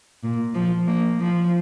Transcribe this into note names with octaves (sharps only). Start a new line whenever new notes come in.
A#2
F3
A#3
F3